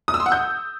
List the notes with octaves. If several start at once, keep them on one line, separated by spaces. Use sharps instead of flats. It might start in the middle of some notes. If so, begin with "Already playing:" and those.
D#6
E6
C6
F#5
G6